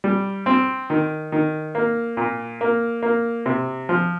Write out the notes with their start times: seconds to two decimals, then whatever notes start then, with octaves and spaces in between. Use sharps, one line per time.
0.04 G3
0.46 C4
0.90 D#3
1.32 D#3
1.75 A#3
2.17 A#2
2.61 A#3
3.03 A#3
3.46 C3
3.89 F3